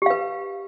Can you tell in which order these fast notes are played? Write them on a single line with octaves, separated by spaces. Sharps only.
G4 F5 B4